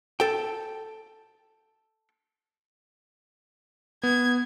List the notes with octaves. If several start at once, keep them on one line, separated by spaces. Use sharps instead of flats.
A4 G5
B3 G#6